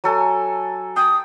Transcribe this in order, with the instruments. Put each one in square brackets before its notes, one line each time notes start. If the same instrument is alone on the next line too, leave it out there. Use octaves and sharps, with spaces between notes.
[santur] F#3 A4 G#5
[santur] G5 [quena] D#6